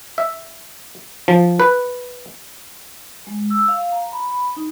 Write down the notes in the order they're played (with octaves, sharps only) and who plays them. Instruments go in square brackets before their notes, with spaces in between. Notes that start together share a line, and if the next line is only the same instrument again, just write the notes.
[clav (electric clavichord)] E5
F3
B4
[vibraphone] G#3
E6
F5
A#5
B5
D#4